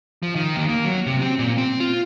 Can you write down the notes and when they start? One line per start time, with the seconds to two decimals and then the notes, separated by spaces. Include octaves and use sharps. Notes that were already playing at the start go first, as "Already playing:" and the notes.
0.23 F3
0.35 D#3
0.56 D#2
0.69 A#3
0.85 F#3
1.06 C3
1.22 C4
1.39 A#2
1.58 C4
1.80 F4